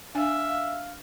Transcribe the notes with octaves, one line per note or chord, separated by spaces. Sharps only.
D4 E5 F5 G#5